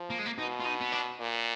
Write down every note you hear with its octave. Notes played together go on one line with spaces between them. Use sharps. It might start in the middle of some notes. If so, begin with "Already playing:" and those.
Already playing: F3
A#3
G#3
A#3
B2 D#4
F4
D#4
B3
D4
A#2